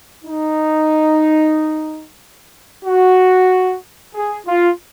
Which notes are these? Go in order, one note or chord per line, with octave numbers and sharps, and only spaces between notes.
D#4
F#4
G#4
F4